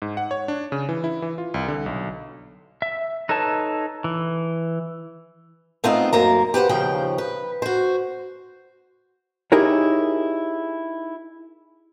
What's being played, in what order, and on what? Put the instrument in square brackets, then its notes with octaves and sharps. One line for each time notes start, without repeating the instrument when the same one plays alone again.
[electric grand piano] G#2
F#5
C#5
D4
C#3
E3
E4
E3
F4
C2
D3
B1
[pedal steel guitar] E5
D#4 A4 B4 C#5 A5
E3
[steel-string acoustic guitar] A3 B3 C4 D#4 F4
F#2 A#3 A#5
G4 B4 C5 F#5
D#2 C#3 F3 G5
B4
F#4 C5
[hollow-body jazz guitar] D#4 E4 G4 G#4 A#4 C#5